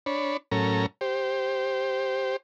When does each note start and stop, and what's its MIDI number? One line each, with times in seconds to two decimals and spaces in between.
0.06 0.37 62
0.06 0.37 73
0.06 0.37 83
0.52 0.86 45
0.52 0.86 54
0.52 0.86 61
0.52 0.86 69
0.52 0.86 70
0.52 0.86 82
1.01 2.36 67
1.01 2.36 72